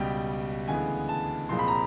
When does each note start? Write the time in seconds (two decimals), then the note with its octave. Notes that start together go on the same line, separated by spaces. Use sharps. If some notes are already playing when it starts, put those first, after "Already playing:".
Already playing: C#2 B2 G3 G5
0.68 D2 C#3 E3 G#3 B3 G#5
1.09 A5
1.49 C2 A#2 F3 G#3 C4 C6
1.59 B5
1.68 A#5